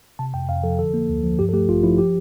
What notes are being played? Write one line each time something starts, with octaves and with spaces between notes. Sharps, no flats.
C3 A5
F2 G5
F2 F5
F3 A4
D3 A4
A#3
D2
F3
G2 G4
A4
A3 G4
A1 F4
F3 E4
G4